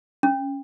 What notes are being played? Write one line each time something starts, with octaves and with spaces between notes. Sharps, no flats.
C#4